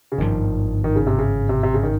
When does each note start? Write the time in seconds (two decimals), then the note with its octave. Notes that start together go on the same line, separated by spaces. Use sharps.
0.12 C#3
0.18 G#1 G2 D#3 F3
0.84 D#3
0.96 C#3
1.07 C3
1.18 C#3
1.49 C3
1.63 C3
1.74 C#3
1.83 D#3